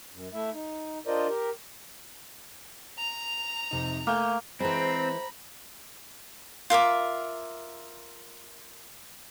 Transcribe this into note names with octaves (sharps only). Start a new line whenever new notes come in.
F#2
A3 E4 E5
D#4
D4 F4 A#4 C5 D5 D#5
G4 A#4
A#5 F7
F2 C3 D#4
A3 A#3 G#5 G6
E3 G#3 C4 C5 A#5 B5
F4 A#4 E5 D6